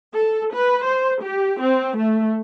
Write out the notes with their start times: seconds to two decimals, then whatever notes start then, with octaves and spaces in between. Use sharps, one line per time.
0.14 A4
0.54 B4
0.85 C5
1.23 G4
1.60 C4
1.97 A3